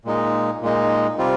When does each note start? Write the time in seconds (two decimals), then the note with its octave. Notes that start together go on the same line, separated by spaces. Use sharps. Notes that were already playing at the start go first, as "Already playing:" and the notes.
0.05 A#2 G#3 D#4
0.62 A#2 G#3 D#4
1.18 C3 G3 C4 F4